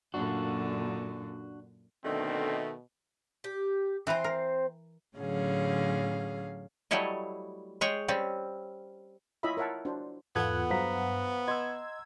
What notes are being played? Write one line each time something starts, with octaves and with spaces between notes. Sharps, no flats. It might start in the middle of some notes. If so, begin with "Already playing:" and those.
F#2 A#2 D3 D4 F#4
B2 D3 D#3 A3 C4
G4
E3 C4 B4 C5 A#5
A#4
A2 D3 F#3 C#4 G#4 F5
F#3 G3 A3 E4 C#5 D#5
G#3 G#4 C#5 G5
G3 C4 C#4
E4 F4 C#5 D#5 E5 B5
A#4 C#5 E5 F#5 A5
D4 F#4 C5
E2 G#2 B3 F4 A4 F#5 F#6 G#6
G2 F#3 C5 F5 A#5 B6
D#5 C6 E6 G#6